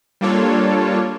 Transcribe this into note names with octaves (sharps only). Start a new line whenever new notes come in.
G3 A#3 D4 F4 A4 C#5